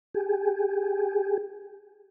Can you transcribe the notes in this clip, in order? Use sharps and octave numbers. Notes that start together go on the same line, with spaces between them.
G4 G#4